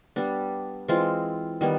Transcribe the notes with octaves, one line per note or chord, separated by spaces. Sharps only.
G3 B3 D4
E3 G#3 C4 F4
D#3 G3 B3